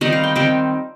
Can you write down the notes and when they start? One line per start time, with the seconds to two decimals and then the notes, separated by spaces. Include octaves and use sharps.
0.01 D#3 G3 C4 D#4 D#5
0.13 F5
0.24 G5
0.36 D#3 G3 C4 D#4 G5